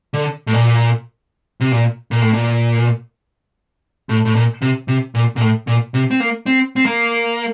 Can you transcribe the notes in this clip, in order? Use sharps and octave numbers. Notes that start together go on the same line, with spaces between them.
D3
A2
A#2
C3
A#2
A#2
A2
A#2
A2
A2
A#2
C3
C3
A#2
A#2
A2
A#2
C3
C4
A#3
C4
C4
A#3